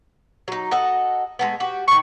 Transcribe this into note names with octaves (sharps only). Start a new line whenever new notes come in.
F#3 D#4
F#4 A4 D#5
G#3 A3 B3
F#4 G4
A#2 D#3 C#6